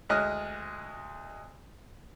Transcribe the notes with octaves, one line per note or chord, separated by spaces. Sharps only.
D2 G#3 D#5 F6 F#6